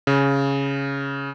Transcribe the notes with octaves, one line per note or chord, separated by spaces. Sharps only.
C#3